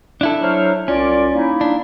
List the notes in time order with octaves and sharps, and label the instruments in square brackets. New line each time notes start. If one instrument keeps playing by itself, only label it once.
[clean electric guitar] D4 E4 A4
[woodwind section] F#3 C5 F6
[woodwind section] C2 F4 D5 [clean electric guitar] C#4
[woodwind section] A#3 D#4 E4
[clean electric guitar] D4